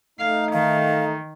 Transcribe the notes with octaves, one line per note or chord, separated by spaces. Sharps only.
A3 D#4 F5
D#3 F5